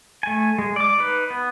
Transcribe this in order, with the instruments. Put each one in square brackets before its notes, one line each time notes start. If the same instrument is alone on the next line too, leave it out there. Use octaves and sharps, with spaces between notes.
[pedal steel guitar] A3 G#5
G#3
D5 D6
D#4 B4
B3